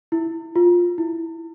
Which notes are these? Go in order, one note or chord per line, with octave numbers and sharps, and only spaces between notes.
E4
F4
E4